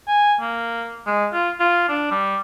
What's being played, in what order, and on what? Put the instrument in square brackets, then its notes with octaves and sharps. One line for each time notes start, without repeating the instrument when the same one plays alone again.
[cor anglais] G#5
A#3
G#3
F4
F4
D4
G3